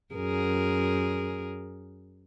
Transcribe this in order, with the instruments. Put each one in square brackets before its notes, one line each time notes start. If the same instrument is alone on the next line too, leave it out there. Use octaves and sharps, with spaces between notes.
[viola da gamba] F#2 G#4 A#4